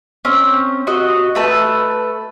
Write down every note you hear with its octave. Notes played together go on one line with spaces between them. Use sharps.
C4 C#4
F#4 D#5
A3 B4 A5